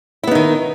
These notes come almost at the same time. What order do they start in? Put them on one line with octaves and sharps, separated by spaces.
E4 B3 D#4 D#3